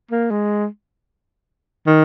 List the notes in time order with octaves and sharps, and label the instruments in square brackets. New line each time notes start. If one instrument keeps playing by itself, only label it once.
[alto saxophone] A#3
G#3
D#3